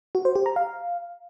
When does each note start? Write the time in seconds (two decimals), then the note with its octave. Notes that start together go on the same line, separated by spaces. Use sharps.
0.15 F#4
0.25 C5
0.35 G4
0.46 A#5
0.56 F5